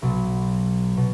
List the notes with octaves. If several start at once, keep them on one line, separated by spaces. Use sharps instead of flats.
B1 B2 F#3
B2